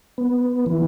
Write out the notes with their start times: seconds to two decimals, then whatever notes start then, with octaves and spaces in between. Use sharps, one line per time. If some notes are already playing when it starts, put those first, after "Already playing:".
0.18 B3
0.66 E3